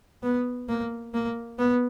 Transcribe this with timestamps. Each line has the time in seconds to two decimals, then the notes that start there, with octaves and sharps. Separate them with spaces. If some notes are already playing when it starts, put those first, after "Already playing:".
0.23 B3
0.69 A#3
1.14 A#3
1.59 B3